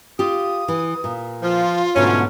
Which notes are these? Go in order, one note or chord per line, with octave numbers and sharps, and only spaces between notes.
F4 G4 D#6
E3
A#2
F3 F4
G#2 B2 D3 F#3 A3 C#4